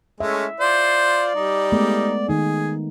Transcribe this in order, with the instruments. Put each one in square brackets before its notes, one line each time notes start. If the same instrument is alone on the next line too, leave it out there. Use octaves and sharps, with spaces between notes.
[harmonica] G#3 A3 C#4 [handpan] E5
[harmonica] F4 C5 [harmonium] D5
[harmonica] G3 D#4
[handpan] G#3 A3 B3
[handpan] D#3 D#4 [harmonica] G#4